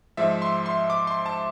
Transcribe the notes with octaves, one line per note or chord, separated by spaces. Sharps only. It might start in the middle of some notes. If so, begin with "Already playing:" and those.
G#2 F3 G#3 E5
C6
C6
D6
C6
A5